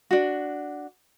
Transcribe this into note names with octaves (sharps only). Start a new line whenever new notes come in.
D4 F#4